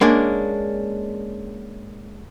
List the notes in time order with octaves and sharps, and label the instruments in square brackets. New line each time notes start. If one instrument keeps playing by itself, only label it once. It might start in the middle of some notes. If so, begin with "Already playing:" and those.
[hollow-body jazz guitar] G#3 A#3 C#4 D4